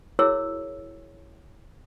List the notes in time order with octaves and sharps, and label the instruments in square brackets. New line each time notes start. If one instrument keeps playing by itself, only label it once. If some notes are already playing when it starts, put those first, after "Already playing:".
[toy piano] E4 F#4 G#4 A#4 C#5 E6